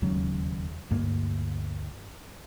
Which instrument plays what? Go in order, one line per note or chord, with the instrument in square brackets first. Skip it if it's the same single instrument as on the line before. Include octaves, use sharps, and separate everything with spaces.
[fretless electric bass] E1 D#2 C#3 F#3
D2 G2 A#3